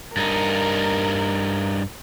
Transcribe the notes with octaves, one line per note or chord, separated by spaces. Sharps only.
G2 D#4 A#4